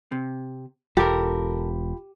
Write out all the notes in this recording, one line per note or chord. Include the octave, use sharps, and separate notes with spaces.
C3
E1 F4 G4 A4 A#4 G5 B5